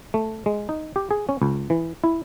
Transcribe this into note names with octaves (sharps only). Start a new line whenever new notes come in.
A3
G#3
D#4
G4
G#4
C#4
C#2
E3
E4